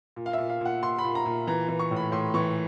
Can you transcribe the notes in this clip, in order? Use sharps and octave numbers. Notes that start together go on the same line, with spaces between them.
A#2
F5
A#2 E5
F5
A#2 F#5
A#2 C6
B5
A#2
A#5
A#2
E3 A#5
E3
C#6
A2
B5
A2 C6
E3 C#6